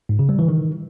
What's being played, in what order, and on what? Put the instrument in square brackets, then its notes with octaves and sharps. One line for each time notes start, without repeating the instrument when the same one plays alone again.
[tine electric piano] G#2
C#3
G3
E3
D#3